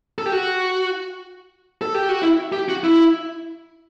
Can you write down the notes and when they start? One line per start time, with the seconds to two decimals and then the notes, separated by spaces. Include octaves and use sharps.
0.18 A4
0.26 G4
0.32 F#4
1.82 A4
1.95 G4
2.09 F#4
2.22 E4
2.52 G4
2.69 F#4
2.84 E4